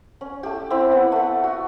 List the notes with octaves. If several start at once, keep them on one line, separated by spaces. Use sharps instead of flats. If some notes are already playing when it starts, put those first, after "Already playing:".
C#4
A3 G4
C4 E4 F#5 B5
B3
A3 F#5
F#4